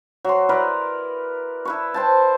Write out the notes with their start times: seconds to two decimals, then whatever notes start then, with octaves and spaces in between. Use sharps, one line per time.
0.25 F#3 C6
0.49 E4 A#4 B4 D5
1.65 E4 B4 C#6
1.94 C5 G5 A5